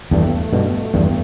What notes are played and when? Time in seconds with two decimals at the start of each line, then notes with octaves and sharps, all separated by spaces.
0.11 E2 G2 A3
0.53 G2 B2
0.94 E2 G2